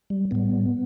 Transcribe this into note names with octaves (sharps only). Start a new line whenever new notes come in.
G3
A2 G3 B3